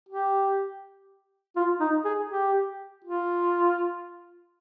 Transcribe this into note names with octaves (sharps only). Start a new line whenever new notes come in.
G4
F4
D#4
G#4
G4
F4